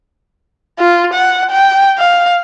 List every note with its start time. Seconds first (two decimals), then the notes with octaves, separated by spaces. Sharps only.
0.79 F4
1.13 F#5
1.51 G5
1.98 F5